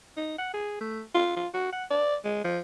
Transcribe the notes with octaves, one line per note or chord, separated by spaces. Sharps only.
D#4
F#5
G#4
A3
F4
F4
F#4
F#5
D5
G#3
F3